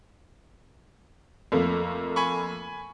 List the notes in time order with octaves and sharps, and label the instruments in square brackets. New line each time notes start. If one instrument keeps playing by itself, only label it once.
[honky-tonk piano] F2 A3 A#3
[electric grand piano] G#5 B5 C#6